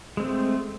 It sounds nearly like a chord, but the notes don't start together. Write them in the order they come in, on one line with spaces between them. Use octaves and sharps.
G#3 C4 A3